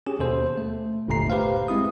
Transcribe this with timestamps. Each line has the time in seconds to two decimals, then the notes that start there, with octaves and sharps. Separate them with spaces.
0.06 C#4 G4 G#4
0.19 D#2 B2 A4 C5
0.58 A3
1.08 G1 D#2 A#2 A3 A#5 C7
1.30 G4 B4 C5 F5
1.68 G#3 C4 E4 D#6